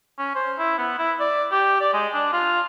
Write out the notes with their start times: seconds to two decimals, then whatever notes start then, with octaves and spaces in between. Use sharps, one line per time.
0.18 C#4
0.35 C5
0.58 E4
0.78 B3
0.98 E4
1.20 D5
1.52 G4
1.80 D5
1.93 G#3
2.14 D4
2.33 F4